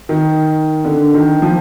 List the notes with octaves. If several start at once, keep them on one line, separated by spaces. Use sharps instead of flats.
D#3
D3
D#3
F3